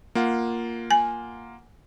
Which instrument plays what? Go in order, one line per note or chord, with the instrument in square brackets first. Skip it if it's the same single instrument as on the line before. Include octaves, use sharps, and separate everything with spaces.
[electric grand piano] A#3 F4 F#5
[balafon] G#5